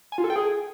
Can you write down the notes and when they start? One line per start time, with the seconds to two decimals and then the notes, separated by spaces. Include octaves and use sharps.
0.12 G#5
0.18 F4
0.24 A4
0.30 G5
0.36 G#4